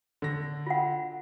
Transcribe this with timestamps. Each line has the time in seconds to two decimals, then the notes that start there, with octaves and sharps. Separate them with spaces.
0.22 D3 A#6
0.67 F4 F#5